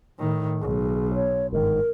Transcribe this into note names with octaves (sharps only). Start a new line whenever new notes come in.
A2 D#3
B1 G#4
C#5
G1 G#2 D#3 A#4